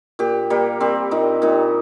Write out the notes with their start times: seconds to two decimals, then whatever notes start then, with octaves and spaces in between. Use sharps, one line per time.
0.19 A#2 G4
0.50 G3 A#3
0.81 G3 C4
1.11 A#2 D#4
1.42 A#2 D#4